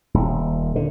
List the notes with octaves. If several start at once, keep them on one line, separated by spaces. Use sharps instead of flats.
D#1
D3